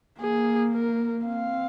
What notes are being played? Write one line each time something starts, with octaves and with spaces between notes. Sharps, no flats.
A#3 G#4
A#4
C4 F5